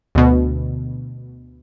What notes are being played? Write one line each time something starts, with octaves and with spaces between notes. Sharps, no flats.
D2 B2